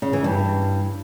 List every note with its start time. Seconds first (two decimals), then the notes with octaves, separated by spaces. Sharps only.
0.02 C#3
0.13 E3
0.24 G2